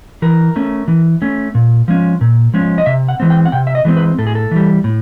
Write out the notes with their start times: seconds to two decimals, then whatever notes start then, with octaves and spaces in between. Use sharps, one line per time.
0.22 E3 A#4
0.56 A3 C#4
0.88 E3
1.22 A3 C#4
1.55 A#2
1.88 F3 G#3 C#4
2.21 A#2
2.54 F3 G#3 C#4
2.78 D#5
2.86 C3 E5
3.09 F#5
3.20 E3 G#3 C4
3.30 G5
3.45 F#5
3.52 C3 G5
3.67 E5
3.75 D#5
3.85 E3 G#3 C4
3.97 B4
4.18 A2 A4
4.27 G#4
4.35 A4
4.51 E3 G3
4.84 A2